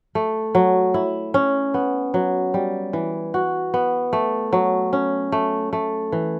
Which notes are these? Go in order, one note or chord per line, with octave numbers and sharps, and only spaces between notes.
A3
F#3
E4
C#4
B3
F#3
G3
E3
F#4
B3
A3
F#3
C#4
A3
A3
E3